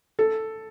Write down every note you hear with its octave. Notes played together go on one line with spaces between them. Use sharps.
A4